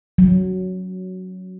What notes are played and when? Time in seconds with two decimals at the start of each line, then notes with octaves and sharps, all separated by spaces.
0.18 F#3